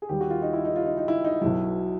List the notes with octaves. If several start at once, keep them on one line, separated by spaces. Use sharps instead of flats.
G#4
D#2 D#3 G3 G4
F#4
F4
D#4
E4
D#4
F4
D#4
D#4
E4
D#4
B1 B2 F#3 E4